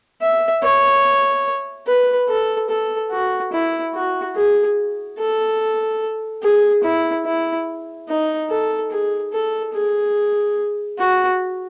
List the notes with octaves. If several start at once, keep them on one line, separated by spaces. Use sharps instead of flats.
E5
C#5
B4
A4
A4
F#4
E4
F#4
G#4
A4
G#4
E4
E4
D#4
A4
G#4
A4
G#4
F#4